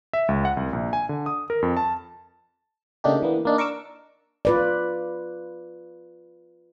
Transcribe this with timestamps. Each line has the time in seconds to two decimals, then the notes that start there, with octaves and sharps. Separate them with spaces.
0.13 E5
0.28 C#2
0.45 F#5
0.57 C2
0.73 A#1
0.93 G#5
1.09 D3
1.26 D#6
1.50 A#4
1.62 F2
1.77 A5
3.04 C#3 A3 A#3 D4 D#4 G4
3.22 E3 A#3 B3
3.45 A#3 D4 D#4
3.58 A#4 C#6 D6 E6
4.45 F4 B4 D5